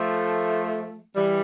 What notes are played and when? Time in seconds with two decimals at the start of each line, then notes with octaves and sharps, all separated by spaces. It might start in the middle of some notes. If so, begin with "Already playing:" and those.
Already playing: F3 A3
1.16 E3 G3